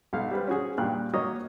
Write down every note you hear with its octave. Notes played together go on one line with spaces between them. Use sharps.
B1 F5
G3 B4 C5
C#4 F#4 G#4
G2 A#2 G4 F5 F#6
F#3 A#3 C#5 D#5